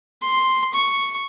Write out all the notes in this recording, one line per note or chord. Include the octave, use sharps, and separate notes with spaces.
C6
C#6